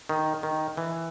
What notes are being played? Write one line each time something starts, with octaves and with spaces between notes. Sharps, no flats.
D#3
D#3
E3